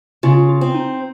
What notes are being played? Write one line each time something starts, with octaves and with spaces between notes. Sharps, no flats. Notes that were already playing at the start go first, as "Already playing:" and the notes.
C#3 F4
F4
C4
D#4